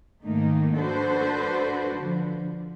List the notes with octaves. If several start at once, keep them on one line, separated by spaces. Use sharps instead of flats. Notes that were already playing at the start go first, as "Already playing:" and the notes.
G#2 D#3 A3 A#3 D#4
D4 F#4 A4 B4 C5
D3 F3